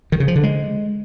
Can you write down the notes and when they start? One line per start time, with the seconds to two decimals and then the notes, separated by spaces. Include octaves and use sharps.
0.12 D#3
0.20 C#3
0.28 F3
0.36 D3
0.43 G#3